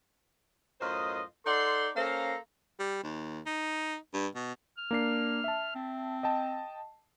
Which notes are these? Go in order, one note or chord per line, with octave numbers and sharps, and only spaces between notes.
F#2 A2 F4 C5 D#5
D#4 A4 D5 F#5 C6
A#3 C#4 A4 C5 F5 A#5
G3
D#2
D#4
G2
B2
F6
A#3 D4 C7
E5 A5
C4
D#5 G5 A5